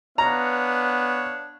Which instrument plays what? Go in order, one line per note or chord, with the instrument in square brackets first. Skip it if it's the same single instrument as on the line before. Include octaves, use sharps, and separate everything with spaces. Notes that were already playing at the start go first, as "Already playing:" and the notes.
[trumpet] B3 [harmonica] D4 C#5 F5 [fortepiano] A#5